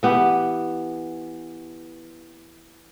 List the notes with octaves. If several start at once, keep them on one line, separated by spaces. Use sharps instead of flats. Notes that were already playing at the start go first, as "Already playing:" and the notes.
E3 B3 G4